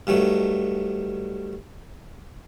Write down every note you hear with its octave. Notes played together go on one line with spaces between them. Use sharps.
G2 D#3 F#3 A3